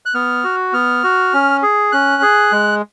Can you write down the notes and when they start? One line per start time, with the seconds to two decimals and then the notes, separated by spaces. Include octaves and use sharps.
0.06 F#6
0.14 B3 F6
0.44 F#4
0.73 B3 F6
1.04 F#4
1.33 C#4
1.63 G#4
1.92 C#4 F#6
2.22 G#4
2.52 G#3